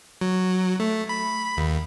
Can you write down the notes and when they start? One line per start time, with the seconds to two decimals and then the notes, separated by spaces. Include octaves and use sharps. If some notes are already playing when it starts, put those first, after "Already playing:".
0.21 F#3
0.80 A3
1.09 B5
1.57 D#2